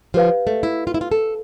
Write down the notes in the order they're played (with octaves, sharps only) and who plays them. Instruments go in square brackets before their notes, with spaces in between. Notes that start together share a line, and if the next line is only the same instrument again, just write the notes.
[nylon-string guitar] F3 [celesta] G4 B4 F5
[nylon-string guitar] A3
E4
F4
E4
F4
A4